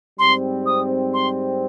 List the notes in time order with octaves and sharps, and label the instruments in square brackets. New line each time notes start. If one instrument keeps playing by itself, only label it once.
[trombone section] G#2 G3 C4 [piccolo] C6
[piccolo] D#6
C6